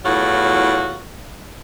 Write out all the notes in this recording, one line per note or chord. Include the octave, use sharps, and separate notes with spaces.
E2 A2 F#3 F4 F#4